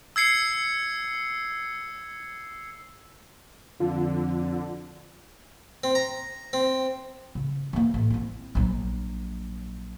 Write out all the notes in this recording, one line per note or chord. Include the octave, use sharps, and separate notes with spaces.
E6 G#6 C7 C#7
F2 D3 F4
C4
A#5
C4
C#3
E3 A#3
A1
C4 E4
A#1 F#3